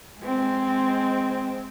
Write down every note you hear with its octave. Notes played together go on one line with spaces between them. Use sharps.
G#3 C4